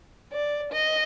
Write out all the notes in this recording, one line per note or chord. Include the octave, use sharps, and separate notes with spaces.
D5
D#5